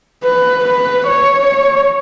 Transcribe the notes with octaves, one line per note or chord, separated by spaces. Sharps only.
B4
B4
C#5